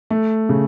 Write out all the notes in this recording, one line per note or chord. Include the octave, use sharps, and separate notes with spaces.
A3
C#3